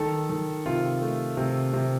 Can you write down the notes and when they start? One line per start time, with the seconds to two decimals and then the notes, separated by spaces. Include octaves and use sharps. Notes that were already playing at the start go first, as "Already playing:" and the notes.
Already playing: D#3 A4
0.30 D#3
0.66 C3 F4
1.02 A3
1.37 C3
1.73 C3